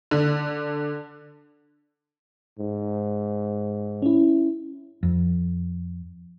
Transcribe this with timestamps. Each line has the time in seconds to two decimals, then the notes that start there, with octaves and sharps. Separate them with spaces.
0.11 D3
2.59 G#2
4.02 C#4 E4
5.03 F2